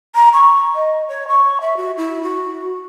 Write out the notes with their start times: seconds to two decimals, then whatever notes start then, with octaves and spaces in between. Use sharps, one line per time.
0.15 A#5
0.33 C#6
0.75 D#5
1.09 C#5
1.28 C#6
1.61 E5
1.77 F#4
1.97 E4
2.23 F#4